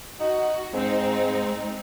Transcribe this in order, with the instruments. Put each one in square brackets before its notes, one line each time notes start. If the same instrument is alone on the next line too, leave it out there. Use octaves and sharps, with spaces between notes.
[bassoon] D#4 [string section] F#4
[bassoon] G#2 [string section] G#3 C4 D#4